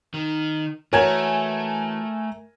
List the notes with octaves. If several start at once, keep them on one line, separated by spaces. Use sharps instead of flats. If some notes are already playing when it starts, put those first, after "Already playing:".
D#3
E3 A3 F#4 A#4 C#5 G#5 G#6